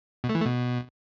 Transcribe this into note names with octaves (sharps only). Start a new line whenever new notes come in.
B2
A3
E3
A3
B2